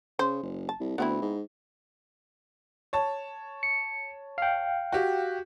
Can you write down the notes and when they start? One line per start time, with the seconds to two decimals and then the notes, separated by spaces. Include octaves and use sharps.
0.19 C#3 C5
0.43 F#1
0.69 A5
0.80 C2
0.98 D2 B3 C4 E4
1.22 G#2
2.93 C#5 A5
3.63 C#7
4.38 F5 G5
4.92 F#4 G4